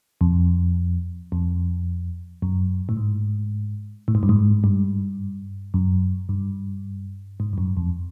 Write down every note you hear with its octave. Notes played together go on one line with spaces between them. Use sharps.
F2
F2
F#2
A2
G#2
A2
G#2
G2
G#2
G2
F#2
G2
G#2
G2
F#2
F2